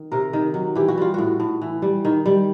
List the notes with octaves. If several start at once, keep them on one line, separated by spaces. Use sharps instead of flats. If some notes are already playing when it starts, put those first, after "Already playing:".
Already playing: D#3
C3 A#4
D#3
F#3
E3 G4
F#4
G3 F4
A2 F#4
A2
E3
G3
D#3
G3